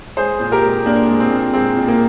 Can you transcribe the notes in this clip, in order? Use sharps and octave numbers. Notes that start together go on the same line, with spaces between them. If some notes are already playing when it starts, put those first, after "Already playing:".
G#3 G#4 C5
A#2
G4 A#4
G#3
A#2 A#3 D4
G#3
C4
A#2
G#3 C4
A#2
A#3